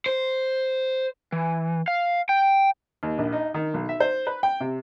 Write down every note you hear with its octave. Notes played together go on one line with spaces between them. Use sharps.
C5
E3
F5
G5
D#2
A#1
D#4
D#3
B1
E5
C5
B4
G5
C3